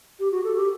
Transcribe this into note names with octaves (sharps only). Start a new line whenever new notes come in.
G4
F#4
A4
G4